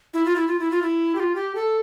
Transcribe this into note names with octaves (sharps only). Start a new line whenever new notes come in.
E4
F4
E4
F4
E4
F4
E4
G4
F4
G4
A4